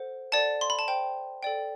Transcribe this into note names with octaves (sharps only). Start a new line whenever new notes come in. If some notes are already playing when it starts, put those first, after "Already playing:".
Already playing: A4 C5 F#5
A4 D5 F#5 A5
C6
B5
A5
C5 G5
A4 D5 G5